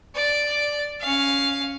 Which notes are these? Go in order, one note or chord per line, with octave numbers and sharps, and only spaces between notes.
D5
C#4 F5